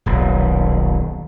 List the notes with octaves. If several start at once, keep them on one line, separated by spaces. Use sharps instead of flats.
D#1 B1